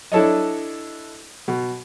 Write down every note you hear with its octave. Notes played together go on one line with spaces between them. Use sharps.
D4 E4 A4 C#5 D#5
B2